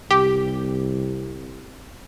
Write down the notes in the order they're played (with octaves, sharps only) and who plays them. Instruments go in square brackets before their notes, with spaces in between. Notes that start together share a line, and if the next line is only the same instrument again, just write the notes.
[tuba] C2 [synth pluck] G4